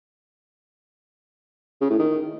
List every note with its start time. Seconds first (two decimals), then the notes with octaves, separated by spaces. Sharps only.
1.81 C#3
1.90 A2
1.99 D#3